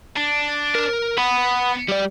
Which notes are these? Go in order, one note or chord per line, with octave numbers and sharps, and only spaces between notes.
D4
A#4
B3 F#5 B5
G3 D5